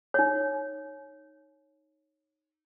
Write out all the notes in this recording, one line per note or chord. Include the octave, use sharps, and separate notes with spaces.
D#4 C#5